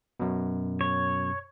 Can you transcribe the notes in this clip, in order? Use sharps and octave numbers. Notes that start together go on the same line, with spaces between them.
F#2 B2
C#5